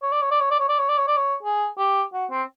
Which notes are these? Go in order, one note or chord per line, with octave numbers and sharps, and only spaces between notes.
C#5
D5
C#5
D5
C#5
D5
C#5
D5
C#5
D5
C#5
D5
C#5
G#4
G4
F#4
C4